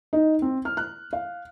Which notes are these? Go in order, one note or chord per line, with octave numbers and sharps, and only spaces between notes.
D#4
C4
F6
F#6
F5